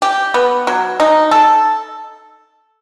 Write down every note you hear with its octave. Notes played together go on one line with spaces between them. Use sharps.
G4
B3
F#3
D#4
A4